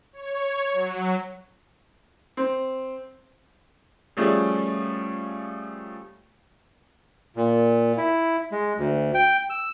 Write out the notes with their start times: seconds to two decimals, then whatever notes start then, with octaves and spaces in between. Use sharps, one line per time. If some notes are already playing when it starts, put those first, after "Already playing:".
0.13 C#5
0.73 F#3
2.37 C4
4.17 F3 G3 A3 C#4 G#4
7.36 A#2
7.98 E4
8.52 G#3
8.78 D2
9.14 G5
9.50 E6